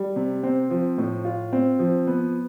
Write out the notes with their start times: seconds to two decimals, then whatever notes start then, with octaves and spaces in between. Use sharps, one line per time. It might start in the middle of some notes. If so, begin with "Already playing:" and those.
Already playing: G3
0.16 C3
0.43 C4
0.70 F3
0.98 A2
1.25 F4
1.53 C4
1.79 F3
2.07 B3